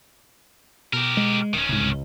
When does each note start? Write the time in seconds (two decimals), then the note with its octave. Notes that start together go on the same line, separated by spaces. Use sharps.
0.93 B2 G4 A#4
1.17 G#3
1.54 D#1 D#3 C#4
1.69 C2 G#2
1.80 C#2